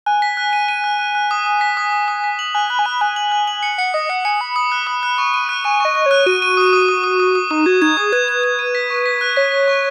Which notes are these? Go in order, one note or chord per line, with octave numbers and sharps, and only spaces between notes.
G#5 F#6
B6
F#6
D#7
D#7
F#6
F#6
F#6
D#6
D#6
B6
D#6
D#6
D#6
B6
F#7
G#5 F#6
B5 F#6
G#5
B5 F#6
G#5 F#6
F#7
F#6
F#7
C#7
F#5 C#7
D#5 D#6
F#5 C#7
G#5 C#7
B5 D#6
D#6
F#6
D#6
F#6
C#6
D#7
F#6
G#5 C#6
D#5 C#6
C#6
C#5 F#6
F#4 D#7
D#7
D#6
D#6
D#6
D#6
D#6
D#6
D#4 D#6
F#4 G#6
D#4 G#6
G#4 D#6
B4 G#6
G#6
G#6
D#7
B6
C#6
B6
F#6
C#5 B6
B6
C#6